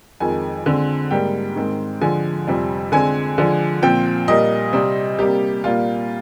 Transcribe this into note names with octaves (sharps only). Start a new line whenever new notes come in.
F2 D#3 G#3 G#5
D3 G#3 C4
G#2 G3 A#3 G5
G#2 D#3 G#3 C4
D3 F3 G#3 G#5
F2 C3 G3 C4
D3 G#3 C4 G#5
D3 F3 G#3
A#2 F3 C4 G5
A#2 G3 A#3 D#5
C3 G3 C4
C3 G3 A#3 G4
A#2 G3 A#3 F4